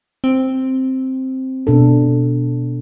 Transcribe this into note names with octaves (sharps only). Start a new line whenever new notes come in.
C4
B2 D4 A4